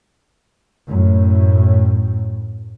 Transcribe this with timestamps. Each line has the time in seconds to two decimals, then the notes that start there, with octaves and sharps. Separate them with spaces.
0.88 F#2 A2